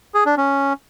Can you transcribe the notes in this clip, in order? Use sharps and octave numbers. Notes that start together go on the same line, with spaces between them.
G#4
D4
C#4